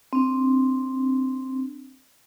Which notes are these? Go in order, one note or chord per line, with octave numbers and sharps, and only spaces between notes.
C4 D4